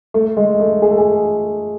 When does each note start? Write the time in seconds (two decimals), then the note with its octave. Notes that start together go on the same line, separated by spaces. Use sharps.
0.14 A3
0.37 G#3
0.60 A3
0.82 G#4
0.91 A4
0.98 G#4